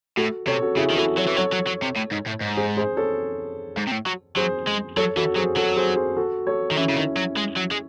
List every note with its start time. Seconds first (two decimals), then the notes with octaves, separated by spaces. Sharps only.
0.17 A2 F#4 A4
0.47 C3 A4 C#5
0.62 F#4 A4
0.77 C#3 E4 G#4
0.90 D#3
0.97 E3 F#4 A4
1.17 F#3 A4 C#5
1.27 E3
1.36 F#3 A4 C#5
1.53 F#3
1.67 F#3
1.83 C3
1.96 A2
2.12 G#2
2.27 A2
2.41 G#2
2.57 G#4 C5
2.77 G#4 C5
2.97 A4 C#5
3.77 G#2
3.87 C3
3.91 A2
4.06 F#3
4.36 F#3 G#4 C5
4.67 G#3
4.97 F#3 A4 C#5
5.16 E3 F#4 A4
5.36 F#3 G#4 C5
5.57 F#3 F#4 A4
5.77 G#4 C5
5.96 G#4 C5
6.16 F#4 A4
6.47 A4 C#5
6.71 D#3
6.76 E3 C#4 E4
6.90 C#3
6.96 D#3
7.17 F#3
7.37 G#3
7.56 F#3
7.71 G#3